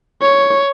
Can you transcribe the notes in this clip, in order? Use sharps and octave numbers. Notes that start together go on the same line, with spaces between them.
C#5